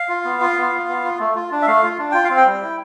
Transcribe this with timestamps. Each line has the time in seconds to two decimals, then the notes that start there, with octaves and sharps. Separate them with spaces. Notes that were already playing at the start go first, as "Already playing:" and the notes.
Already playing: F5
0.09 F4
0.25 B3
0.41 F4
0.57 B3
0.72 F4
0.88 B3
1.04 F4
1.19 A3
1.35 F4
1.51 D4
1.62 E5
1.67 A3 F5
1.83 F4
1.98 D4
2.11 F4 G5
2.24 F5
2.30 C4
2.37 G5
2.46 G3
2.62 E4